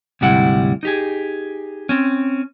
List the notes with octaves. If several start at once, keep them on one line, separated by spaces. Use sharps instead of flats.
D2 G#2 C3 G3 E4 F#5
D#4 G4 G#4
C4 C#4